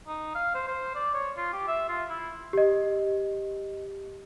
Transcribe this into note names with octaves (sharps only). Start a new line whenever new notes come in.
D#4
F5
C5
C5
D5
C#5
F4
G4
E5
F4
E4
G4 D#5